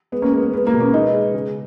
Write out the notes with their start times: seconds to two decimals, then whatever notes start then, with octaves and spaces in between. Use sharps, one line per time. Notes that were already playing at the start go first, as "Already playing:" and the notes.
0.12 G#3 B3
0.22 A#3 C#4
0.32 G#3 B3
0.43 B3
0.53 G#3 B3
0.67 A#3
0.74 B2
0.80 A#3 C#4
0.93 G#3 B3 D#4
1.13 G#3
1.34 C#3